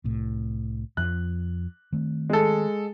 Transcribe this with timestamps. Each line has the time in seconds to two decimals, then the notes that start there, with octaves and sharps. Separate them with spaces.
0.04 C2 A2
0.97 F2 F3 F#6
1.92 D#3 A3 C4
2.30 G#3 A4